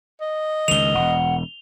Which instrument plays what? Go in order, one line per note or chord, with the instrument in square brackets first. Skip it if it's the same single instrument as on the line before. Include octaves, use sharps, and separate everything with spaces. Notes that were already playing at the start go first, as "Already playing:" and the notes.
[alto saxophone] D#5
[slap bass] C#2 D#3 [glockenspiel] F7 G7
[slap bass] E1 [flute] F#5